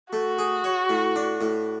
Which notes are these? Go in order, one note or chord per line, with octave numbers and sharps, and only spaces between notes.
A3 F#4
G#4
C#5
A2
D4
A2